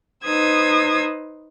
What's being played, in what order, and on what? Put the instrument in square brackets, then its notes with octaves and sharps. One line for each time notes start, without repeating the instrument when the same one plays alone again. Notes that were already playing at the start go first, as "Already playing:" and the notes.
[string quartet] D#4 B4 C5 D#6 E6 G#6